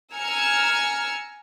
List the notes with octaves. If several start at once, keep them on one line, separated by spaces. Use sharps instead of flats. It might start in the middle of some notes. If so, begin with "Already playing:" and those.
G#5 A#5 E6 F6 G#6 C#7